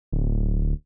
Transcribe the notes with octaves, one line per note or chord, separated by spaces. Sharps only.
D1